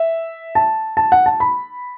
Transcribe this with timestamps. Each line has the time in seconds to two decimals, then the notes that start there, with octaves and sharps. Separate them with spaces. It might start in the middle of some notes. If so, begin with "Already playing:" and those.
Already playing: E5
0.55 A5
0.97 A5
1.12 F#5
1.26 A5
1.40 B5